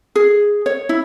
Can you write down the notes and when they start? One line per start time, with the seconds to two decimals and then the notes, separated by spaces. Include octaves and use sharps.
0.15 G#4
0.66 C#5
0.89 E4